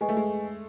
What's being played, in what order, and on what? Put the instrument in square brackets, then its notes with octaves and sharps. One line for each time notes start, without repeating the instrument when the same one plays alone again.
[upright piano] G#3 [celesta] B4 D#5 G#5 C#6
[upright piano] A3
G#3